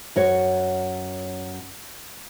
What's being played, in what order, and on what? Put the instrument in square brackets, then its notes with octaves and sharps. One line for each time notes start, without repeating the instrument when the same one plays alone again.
[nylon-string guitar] F#2 F#4 C#5